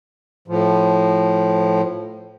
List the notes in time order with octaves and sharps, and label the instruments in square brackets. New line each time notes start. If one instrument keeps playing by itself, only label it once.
[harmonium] A2 F3